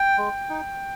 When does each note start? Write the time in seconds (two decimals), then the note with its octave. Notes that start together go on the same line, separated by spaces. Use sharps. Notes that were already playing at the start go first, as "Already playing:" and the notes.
Already playing: G5
0.18 G#3
0.49 D#4